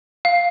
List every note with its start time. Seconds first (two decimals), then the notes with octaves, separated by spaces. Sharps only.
0.25 F5